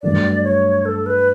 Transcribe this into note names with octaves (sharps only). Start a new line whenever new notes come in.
G2 F#3 A3 D4 D5
C#5
A4
B4